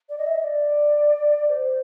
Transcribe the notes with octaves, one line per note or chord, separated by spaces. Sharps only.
D5
D#5
E5
D#5
D5
D5
C5